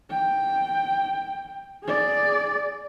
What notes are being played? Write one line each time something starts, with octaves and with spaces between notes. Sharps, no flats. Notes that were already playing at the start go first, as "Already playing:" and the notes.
G5
G#4 D5